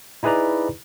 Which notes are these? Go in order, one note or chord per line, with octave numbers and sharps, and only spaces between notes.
D#4 E4 G#4 B4 D5 A#5